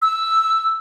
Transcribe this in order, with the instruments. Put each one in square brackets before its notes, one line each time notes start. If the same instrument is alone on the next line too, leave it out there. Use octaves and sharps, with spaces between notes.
[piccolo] E6